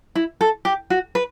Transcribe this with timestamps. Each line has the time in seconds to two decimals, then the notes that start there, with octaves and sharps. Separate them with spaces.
0.15 E4
0.41 A4
0.65 G4
0.90 F#4
1.15 B4